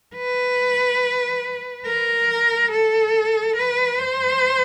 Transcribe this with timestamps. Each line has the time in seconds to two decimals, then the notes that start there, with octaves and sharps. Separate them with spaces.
0.16 B4
1.86 A#4
2.71 A4
3.56 B4
3.99 C5